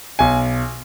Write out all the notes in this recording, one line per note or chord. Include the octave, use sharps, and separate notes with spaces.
B1 G#5